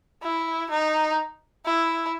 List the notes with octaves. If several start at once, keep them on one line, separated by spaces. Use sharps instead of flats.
E4
D#4
E4